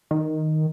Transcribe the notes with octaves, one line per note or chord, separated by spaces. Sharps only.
D#3